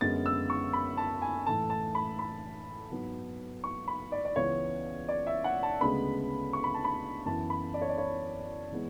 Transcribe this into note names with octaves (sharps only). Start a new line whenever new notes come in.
F#2 D3 G#3 B3 A6
E6
C#6
B5
A5
G#5
A2 E3 A3 A5
A5
B5
B5
G#2 F#3 B3
C#6
B5
D5
D5
C#2 C#3 E3 B3 C#5
D5
E5
F#5
A5
D2 C#3 G#3 B3 B5
C#6
B5
A5
B5
F#2 E3 B3 A5
B5
D5
C#5
D5
C#5
E3 G#3 B3